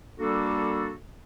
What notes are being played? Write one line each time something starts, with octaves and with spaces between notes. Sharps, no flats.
G3 A#3 D4 F#4 A4